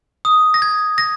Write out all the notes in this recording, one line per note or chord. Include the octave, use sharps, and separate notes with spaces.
D#6
A#6
G#6
A#6